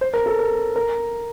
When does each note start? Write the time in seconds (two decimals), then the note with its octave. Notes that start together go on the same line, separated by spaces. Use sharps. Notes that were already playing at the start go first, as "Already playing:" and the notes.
0.01 C5
0.14 A#4
0.26 A4
0.39 A#4
0.76 A#4